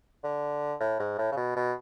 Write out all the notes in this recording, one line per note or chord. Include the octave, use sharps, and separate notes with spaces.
D3
A2
G#2
A2
C#3
B2
B2